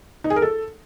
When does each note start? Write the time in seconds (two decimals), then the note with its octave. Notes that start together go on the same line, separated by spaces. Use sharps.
0.24 D#4
0.30 G#4
0.36 A#4
0.42 A4